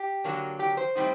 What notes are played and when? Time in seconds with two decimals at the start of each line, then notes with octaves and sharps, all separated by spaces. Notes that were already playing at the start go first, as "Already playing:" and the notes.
Already playing: G4
0.24 D3 F#3 A#3 D4
0.59 G4
0.77 C5
0.95 A2 G3 C4 D#4